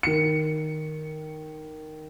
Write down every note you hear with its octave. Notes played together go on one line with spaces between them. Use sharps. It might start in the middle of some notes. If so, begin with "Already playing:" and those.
D#3 C#7